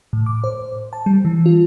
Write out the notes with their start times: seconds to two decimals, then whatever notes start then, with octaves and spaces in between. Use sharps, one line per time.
0.13 A2
0.26 D6
0.44 C5
0.93 A5
1.06 G3
1.25 E3
1.46 F4